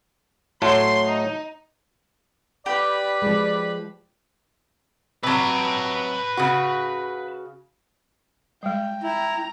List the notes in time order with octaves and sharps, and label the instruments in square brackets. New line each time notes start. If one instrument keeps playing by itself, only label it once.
[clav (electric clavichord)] A2 F#3 A3 [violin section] C6
[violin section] D#4
[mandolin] G4 [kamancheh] B4 B5 [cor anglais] D5
[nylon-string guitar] F3 G#3
[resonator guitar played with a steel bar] C3 F#3 [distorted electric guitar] B4 A5
[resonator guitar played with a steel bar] C#3 F#4
[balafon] G3 G#3 [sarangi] G5
[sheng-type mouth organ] E4 [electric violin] A#5